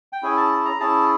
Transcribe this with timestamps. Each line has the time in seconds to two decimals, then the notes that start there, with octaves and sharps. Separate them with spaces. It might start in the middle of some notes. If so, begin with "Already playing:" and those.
0.13 G5
0.23 C#4 E4 G#4 G#5
0.37 A5
0.52 A5
0.65 A#5
0.79 C#4 E4 G#4 A5